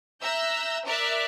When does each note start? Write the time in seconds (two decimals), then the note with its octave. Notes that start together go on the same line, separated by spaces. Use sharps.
0.22 E5 A#5 E6 F#6 G6 A#6
0.85 A#4 D5 E5 D6 F6 F#6